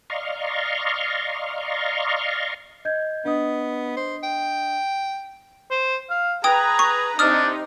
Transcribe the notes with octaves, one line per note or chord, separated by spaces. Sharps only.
D5 D#5 F5 A#5 C6 C#6
D#5 G6 G#6
B3 D4 D#5 D#6
C5
G5
C5
F5
G#4 B4 G5 A#5 D#6
C#6
C3 D4 D#4 D#6 F6